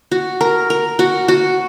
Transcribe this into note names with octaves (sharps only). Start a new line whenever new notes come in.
F#4
A#4
A#4
F#4
F#4